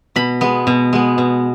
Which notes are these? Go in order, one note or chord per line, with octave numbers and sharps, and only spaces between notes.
B2 B5
G#3 B3
B2
G#3 B3
B2